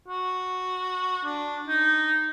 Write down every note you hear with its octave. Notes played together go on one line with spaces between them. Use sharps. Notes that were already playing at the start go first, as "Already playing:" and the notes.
F#4
D4
D#4